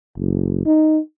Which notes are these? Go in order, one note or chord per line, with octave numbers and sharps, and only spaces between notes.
F#1
D#4